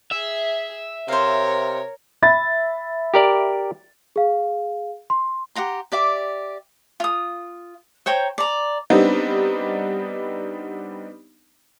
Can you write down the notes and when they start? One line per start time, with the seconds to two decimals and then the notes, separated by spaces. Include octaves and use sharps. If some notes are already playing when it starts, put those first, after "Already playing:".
0.12 G#4 E5
1.08 C3 A#4 C5 C#5 F5
2.22 E5 B5 A6
3.14 G4 A#4 D5
4.16 G#4 F5
5.10 C6
5.55 G4 F#5 A#5 C6
5.92 G4 D5 E5 D6
7.00 F4 D#6
8.06 C5 C#5 G5 A#5
8.38 D5 A#5
8.90 G3 B3 C4 D4 D#4